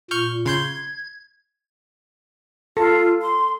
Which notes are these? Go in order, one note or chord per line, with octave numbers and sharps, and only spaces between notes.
A#2 C#6 F6 G6
C#3 C6 G6 G#6
F4 A4
C6